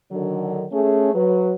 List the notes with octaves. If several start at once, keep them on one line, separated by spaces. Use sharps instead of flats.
D3 D#3 F#3
A3 C#4 G#4
F#3 B4